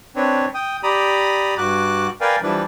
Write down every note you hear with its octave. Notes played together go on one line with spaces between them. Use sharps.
C4 D4 B4 C#5
G5 D#6
G4 D5 A#5 B5 D#6
G2 F#4 D6 F#6
A#4 B4 D5 F5 G5 G#5
E3 F3 G3 D4 E4 B4